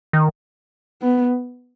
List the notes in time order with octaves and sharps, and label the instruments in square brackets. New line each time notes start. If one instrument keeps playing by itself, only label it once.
[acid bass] D#3
[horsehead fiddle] B3